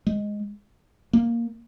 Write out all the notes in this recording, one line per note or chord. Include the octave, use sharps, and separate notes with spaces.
G#3
A#3